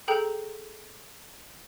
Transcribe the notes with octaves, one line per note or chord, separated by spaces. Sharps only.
G#4 A4 G5 A#5 G6